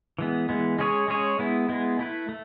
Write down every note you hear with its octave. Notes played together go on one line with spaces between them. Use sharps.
E3 G#3 B3
E3 G#3 B3
G#3 C#4 G#4 C#5
G#3 C#4 G#4 C#5
G#3 B3 E4
G#3 B3 E4
A3 E4 B4
A3